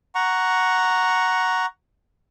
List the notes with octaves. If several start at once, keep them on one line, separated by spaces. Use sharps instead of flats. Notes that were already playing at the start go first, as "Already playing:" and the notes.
F#5 A#5 C#6